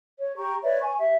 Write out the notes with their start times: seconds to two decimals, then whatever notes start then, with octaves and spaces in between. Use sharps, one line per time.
0.19 C#5
0.36 G4 A#5 C#6
0.63 B4 C#5 D5 E5
0.80 G#5 C#6
0.98 G4 E5